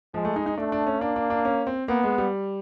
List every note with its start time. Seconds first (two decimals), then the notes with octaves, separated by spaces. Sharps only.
0.14 F3 G#3
0.25 A3
0.36 D#4
0.46 D#4
0.58 A3 D4
0.72 D4
0.87 C#4
1.01 A#3 D4
1.16 D4
1.30 D4
1.45 C#4
1.67 C4
1.88 A#3 B3
2.04 G#3
2.18 G3